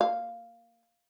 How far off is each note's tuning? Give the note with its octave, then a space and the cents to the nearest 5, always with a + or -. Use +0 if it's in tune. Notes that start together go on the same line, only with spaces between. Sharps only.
A#3 -10 F5 +0